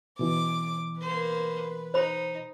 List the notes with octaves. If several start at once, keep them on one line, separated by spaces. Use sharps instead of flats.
B2 E3 D6
A#3 B4 C5
D#4 C5 B5